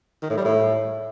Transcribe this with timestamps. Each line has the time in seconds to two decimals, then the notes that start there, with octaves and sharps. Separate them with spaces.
0.22 D#3
0.30 A2
0.37 G3
0.44 A2